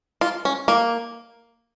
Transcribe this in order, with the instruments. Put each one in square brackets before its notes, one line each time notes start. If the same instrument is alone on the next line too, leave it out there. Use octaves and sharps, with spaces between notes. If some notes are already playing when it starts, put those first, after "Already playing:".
[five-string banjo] F4
C#4
A#3